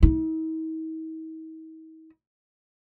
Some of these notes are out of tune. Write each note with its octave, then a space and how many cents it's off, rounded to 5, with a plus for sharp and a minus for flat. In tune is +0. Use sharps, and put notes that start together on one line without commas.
D#4 +45